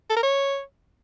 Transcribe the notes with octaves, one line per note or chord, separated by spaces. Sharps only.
A4
A#4
C#5